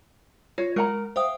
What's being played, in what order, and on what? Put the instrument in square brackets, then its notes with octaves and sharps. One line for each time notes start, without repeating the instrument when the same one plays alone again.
[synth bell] F4 [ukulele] C#5
[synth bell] G#3 [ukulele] A#4 F#5 A#5
[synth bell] C5 E5 D#6 [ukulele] F5 G5